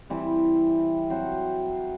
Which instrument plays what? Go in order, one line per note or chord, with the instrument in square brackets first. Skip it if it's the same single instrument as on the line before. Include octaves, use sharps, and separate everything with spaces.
[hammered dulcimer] E3 G3 C4 E4
F#3 C4 F#4 C5